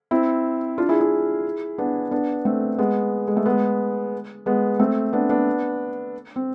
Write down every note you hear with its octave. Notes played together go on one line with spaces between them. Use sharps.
C4 E4
D4 F4
E4 G#4
E4 G#4
B3 D4
B3 D4
A3 C4
G#3 B3
G#3
A3
G#3 B3
G#3 B3
A3 C4
B3 D4
B3 D4
C4